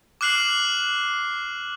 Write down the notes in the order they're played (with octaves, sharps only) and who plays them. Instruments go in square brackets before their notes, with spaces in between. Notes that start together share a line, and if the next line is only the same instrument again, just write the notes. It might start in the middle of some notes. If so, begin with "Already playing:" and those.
[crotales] D6 F6 F#6 C7 F#7